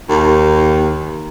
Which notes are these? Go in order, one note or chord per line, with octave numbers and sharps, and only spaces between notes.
D#2